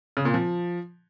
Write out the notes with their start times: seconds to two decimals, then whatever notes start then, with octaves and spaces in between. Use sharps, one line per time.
0.17 C#3
0.25 A#2
0.34 F3